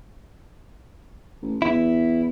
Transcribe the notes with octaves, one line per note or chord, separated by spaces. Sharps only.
A1
E2 E4